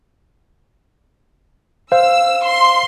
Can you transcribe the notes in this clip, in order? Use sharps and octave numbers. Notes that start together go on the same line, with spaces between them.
C5 F5 E6
C6